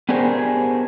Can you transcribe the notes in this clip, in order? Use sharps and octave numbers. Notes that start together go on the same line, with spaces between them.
B3 D4 G4 G#4 A#4 C5